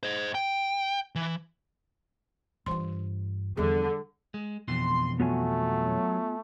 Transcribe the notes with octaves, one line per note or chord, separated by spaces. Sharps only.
C5 D#5
G5
E3
G2 E3 F4 C6
E2 D3 F3 G3 G#4
G#3
F2 B2 E3 C6
F#3 A3 B3 F4 G#5